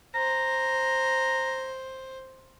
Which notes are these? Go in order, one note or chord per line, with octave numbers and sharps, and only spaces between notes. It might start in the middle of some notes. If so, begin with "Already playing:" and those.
C5 A#5